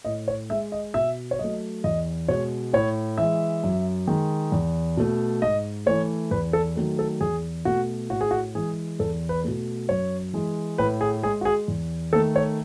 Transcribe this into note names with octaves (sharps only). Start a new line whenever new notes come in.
A2 D#5
C#5
G#3 E5
D#5
B2 E5
C#5
F#3 A3 D#5
E2 D#5
B2 G#3 C#5
A2 C#5
E3 G#3 E5
F#2
D#3 G#3
E2
B2 A3
G#2 D#5
E3 A3 C#5
E2 B4
A4
D#3 F#3 A3
A4
E2 G#4
B2 A3 F#4
A2 F#4
G#4
F#4
E3 G#3 G#4
E2 A4
B4
B2 A3
F#2 C#5
E3 G#3
A2 B4
G#4
G#3 G#4
F#4
G#4
E2
D#3 A3 A4
C#5